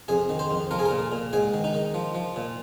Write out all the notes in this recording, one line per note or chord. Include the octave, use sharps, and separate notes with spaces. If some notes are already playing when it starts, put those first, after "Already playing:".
F2 G#4
D#3
C5
F2
F3 A#4
G#4
A#4
A#2
A#2
G#2 G#4
D#3
D#4
D#3
F3
F3
A#2